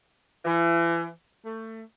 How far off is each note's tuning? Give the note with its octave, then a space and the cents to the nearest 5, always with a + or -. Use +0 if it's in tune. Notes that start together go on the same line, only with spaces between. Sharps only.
E3 +35
A3 +25